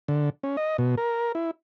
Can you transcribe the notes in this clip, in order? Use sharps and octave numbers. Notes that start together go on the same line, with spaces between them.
D3
C#4
D#5
B2
A#4
E4